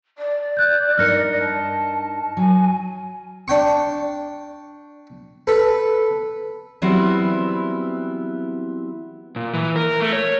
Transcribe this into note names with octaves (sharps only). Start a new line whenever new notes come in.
D5
F#6 G6
G2 D#4 A#4 F6 A#6 C#7
A5
F#3 G#5
D4 G5 C#6
A4 B4
E3 F#3 G3 B3 C4 E4
A#2
E3
A#4
A3
C#5